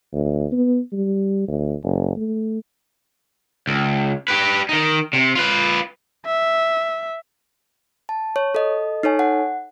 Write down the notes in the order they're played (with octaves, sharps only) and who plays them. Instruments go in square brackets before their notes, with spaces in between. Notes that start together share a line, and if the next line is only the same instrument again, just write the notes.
[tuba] D2
B3
G3
D2
F#1
A3
[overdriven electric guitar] C#2
G4 B4
D#3 D#4
C3
F4 B4
[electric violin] E5
[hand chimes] A5
C#5
A4 D#5
D#4 A4 C#5 G#5
F#5